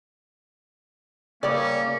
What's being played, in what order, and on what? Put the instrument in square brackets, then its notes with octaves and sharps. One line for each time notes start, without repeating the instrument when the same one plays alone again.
[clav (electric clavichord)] C#3 G3 G4 [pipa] E3 D5 [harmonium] A#3 [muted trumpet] C#4